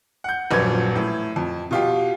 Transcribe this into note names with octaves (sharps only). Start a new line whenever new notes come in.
F#5 G6
D#1 A#1 F#2 B4 G#6
A2
F2
B2 F4 G4